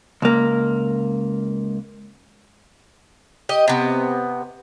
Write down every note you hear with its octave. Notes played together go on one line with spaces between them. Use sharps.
C#2 A#3
G4 D#5
C3 B3